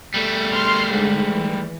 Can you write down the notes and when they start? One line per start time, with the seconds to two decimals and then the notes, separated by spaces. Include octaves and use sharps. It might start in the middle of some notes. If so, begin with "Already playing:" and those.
0.14 G3 A3
0.53 C6 F6 C7
0.91 G#2 D3
1.29 E3